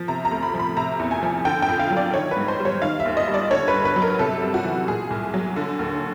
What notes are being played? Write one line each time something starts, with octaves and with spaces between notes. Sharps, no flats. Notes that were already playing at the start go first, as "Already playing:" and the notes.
Already playing: F3
C3 A#5
A#5
D2
B5
F3
B5
C3 A#5
E2
G#5
F3
D3 G5
G5
F2
F5
F#3
D5
D#3 C#5
B4
G#2
C5
G3
C#5
D#3 F5
E5
D#2
D#5
G3
D5
D3 C#5
B4
G2
B4
F#3
A#4
C3 A4
G3
F#4
E3
A#2 G#4
C2
F#3
D3
D#2